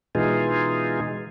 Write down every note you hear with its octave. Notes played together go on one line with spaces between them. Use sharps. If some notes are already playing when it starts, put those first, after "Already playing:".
B2 E3 G#3 D#4 F4 G#4